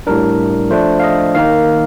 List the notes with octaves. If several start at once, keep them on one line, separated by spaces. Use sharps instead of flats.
A2 G3 D4 A#4
F3 A3 D4 C5
F5
D#5
D#3 A#3 D#4 F5